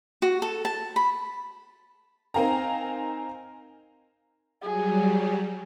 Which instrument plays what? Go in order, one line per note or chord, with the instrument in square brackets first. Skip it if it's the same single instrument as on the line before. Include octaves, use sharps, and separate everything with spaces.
[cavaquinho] F#4
A4
A5
B5
[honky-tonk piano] C4 D#4 A#4 F5 G#5 A#5
[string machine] F#3 G3 [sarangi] G#4